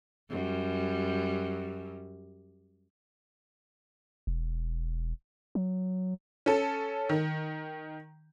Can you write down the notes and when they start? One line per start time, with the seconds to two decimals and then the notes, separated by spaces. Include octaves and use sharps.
0.30 F#2 G3
4.27 E1
5.55 F#3
6.46 C#4 A4
7.09 D#3